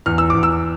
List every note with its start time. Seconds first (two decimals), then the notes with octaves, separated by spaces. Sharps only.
0.06 E2 F6
0.18 E6
0.30 E2 D6
0.43 E6